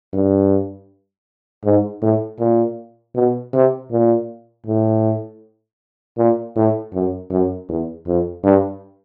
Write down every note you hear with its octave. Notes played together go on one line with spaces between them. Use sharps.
G2
G#2
A2
A#2
B2
C3
A#2
A2
A#2
A2
F#2
F#2
E2
F2
G2